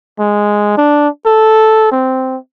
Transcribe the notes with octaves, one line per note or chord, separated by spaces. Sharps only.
G#3
D4
A4
C4